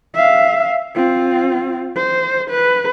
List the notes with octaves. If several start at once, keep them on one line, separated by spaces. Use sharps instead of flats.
E5 F5
C4 F4
C5
B4